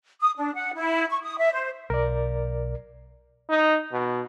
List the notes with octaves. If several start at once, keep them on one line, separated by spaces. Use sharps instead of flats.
D#6
D4
F#5
E4
C#6
D#6
E5
C5
B1 A#4 D5
D#4
B2